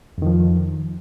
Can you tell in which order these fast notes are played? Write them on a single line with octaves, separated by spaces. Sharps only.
F2 D#3 F3